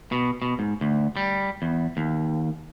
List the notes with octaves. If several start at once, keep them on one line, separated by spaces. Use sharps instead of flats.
B2
B2
G#2
D2
G3
E2
D#2